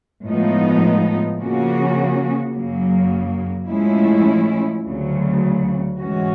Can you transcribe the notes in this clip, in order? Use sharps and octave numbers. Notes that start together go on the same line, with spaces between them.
A2 F3 G#3 B3 D#4
C#3 F3 A#3 C#4 F#4
F#2 C#3 F#3 A#3
A2 F3 G#3 C#4 E4
D2 C#3 F#3
G#2 E3 G#3 C#4 F#4